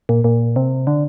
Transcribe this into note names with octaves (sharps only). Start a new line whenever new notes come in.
A#2
A#2
C3
D3